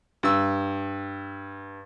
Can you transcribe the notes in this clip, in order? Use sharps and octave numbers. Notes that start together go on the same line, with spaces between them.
G2 E6